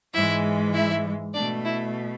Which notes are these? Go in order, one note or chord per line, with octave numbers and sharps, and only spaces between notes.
G#2 E3 G#3 E4 E5
E4 E5
B2 A3 D4 D5
E4